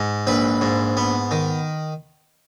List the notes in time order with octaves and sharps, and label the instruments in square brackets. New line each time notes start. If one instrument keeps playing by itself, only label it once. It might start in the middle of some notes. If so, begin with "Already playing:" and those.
Already playing: [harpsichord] G#2
A#1 B4
G#2
B3
D#3